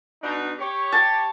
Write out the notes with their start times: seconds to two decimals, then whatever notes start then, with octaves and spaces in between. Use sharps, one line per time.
0.22 B2 D4 D#4
0.59 G4 C#5
0.92 A5